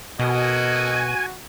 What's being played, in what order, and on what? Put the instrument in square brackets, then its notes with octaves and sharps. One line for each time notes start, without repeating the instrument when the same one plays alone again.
[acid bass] B2 [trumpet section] F#4 [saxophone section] A4 A#4 D#5 [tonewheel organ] G#5